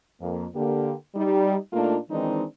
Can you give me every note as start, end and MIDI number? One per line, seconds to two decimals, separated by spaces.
0.21 0.46 41
0.21 0.46 58
0.55 0.93 50
0.55 0.93 58
0.55 0.93 67
1.15 1.56 55
1.15 1.56 63
1.73 1.97 46
1.73 1.97 57
1.73 1.97 58
1.73 1.97 62
1.73 1.97 63
1.73 1.97 65
2.10 2.44 51
2.10 2.44 52
2.10 2.44 56
2.10 2.44 60
2.10 2.44 62
2.10 2.44 63